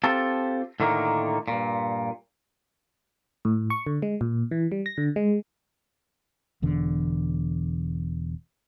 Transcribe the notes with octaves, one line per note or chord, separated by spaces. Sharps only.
C4 F4 G4 A4 A5
A2 D3 D#3 A#3
G2 A#2
A2
C#6
D3
G#3
A#2
E3
G3
A#6
D3
G#3
E1 E2 D3